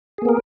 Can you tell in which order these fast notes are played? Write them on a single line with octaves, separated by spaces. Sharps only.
G#4 A#3 B3 A#4